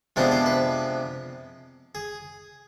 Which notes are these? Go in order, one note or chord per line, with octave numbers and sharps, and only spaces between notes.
C3 F3 G#3 B3 D4 C5
C5
B4
G#4